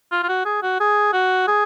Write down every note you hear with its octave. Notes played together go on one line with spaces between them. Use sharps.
F4
F4
F#4
G#4
F#4
G#4
F#4
G#4